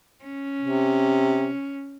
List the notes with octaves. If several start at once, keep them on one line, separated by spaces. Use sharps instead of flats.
C#4
C3